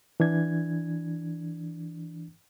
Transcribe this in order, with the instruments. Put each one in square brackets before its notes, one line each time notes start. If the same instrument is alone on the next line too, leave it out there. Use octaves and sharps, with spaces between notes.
[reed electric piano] E3 D4 G#6